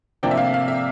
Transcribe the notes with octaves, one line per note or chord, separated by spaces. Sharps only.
C3 F3 A#3 D4 G5
E5
F5
F5
E5